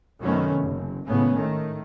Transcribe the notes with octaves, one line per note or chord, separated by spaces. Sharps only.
F#2 C3 D#3 A3 B3 C#4
F#1
G#1 A2 C#3 B3 C#4
D#3 A3